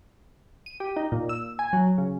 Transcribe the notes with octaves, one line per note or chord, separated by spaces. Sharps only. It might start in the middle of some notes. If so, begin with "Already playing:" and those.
D#7
G4
D#4
A#2
E6
G#5
F#3
C#3